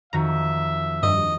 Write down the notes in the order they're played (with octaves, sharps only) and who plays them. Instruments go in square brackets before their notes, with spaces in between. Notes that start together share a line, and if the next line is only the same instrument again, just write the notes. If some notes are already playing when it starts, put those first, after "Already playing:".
[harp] F2 D#3 F#4 [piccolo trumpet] E5 [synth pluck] A#5
[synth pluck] G2 [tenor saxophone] D#5